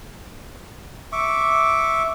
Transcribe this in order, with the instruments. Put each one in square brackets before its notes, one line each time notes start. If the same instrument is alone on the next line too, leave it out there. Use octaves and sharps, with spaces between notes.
[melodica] E5 C#6 D6